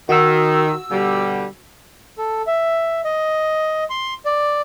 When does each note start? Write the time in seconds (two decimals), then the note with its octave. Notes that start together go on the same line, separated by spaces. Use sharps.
0.09 D#3 F#4 E6
0.91 B2 D3 G3
2.18 A4
2.47 E5
3.05 D#5
3.90 C6
4.26 D5